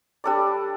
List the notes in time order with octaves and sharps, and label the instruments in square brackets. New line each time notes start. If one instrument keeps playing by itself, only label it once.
[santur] G3 D4 A4 D5